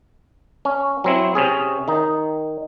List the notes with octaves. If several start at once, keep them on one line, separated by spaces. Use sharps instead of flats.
C#4
F#3 C4 E4
C3 C#4 G#4
D#3 D#4